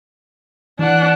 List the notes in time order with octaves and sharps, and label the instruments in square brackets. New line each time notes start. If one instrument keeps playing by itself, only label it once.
[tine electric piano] E3 [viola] D4 F#5